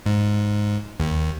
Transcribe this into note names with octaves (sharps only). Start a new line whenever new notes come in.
G#2
D#2